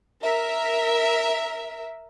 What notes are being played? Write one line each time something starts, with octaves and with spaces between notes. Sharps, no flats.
A#4 E5